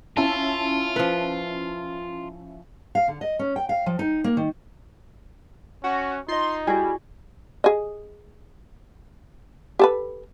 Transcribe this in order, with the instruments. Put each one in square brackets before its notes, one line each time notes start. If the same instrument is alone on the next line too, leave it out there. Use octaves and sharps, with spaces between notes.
[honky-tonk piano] C#4 E4 A5 [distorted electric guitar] F4
[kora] F3 B4
[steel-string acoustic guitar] F5
D3
D#5
C#4
G5
F5
F3
D#4
A#3
D#3
[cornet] C#4 [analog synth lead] F#4
[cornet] D#4 [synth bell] F4 D#5 [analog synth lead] C6
[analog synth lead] G3 [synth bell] E4 F#4 [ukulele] G#4
[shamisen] G#4 D#5
G4 A4 B4